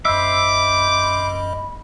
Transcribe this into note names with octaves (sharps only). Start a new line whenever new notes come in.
F#2 C5 D#5 E5 B5 D6